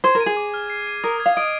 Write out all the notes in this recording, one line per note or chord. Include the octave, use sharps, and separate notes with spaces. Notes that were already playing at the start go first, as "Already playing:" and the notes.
C5 G#6
A#4
D#7
G#4
D6
F6
C7
D#7
A#4 D#6
G#6
F5
D#5 D7